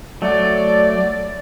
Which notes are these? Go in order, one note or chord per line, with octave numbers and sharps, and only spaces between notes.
F#3 A3 D5